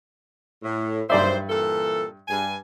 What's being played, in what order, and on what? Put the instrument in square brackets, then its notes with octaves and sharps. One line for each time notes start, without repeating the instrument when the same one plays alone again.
[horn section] A2
[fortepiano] G2 D5 E5 [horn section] D#3 F#3 C5
[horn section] A#2 E3 A4
G2 G#5